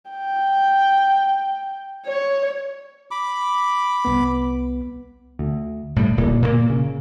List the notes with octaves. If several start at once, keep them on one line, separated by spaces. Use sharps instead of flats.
G5
C#5
B5 D6
C2 B3
D2
A2 G3
D1 A#2
A#2 F#3 A#3
C#3